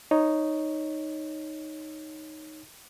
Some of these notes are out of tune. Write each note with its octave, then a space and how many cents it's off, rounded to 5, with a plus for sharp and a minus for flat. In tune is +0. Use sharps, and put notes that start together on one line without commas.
D#4 +0 C#5 +0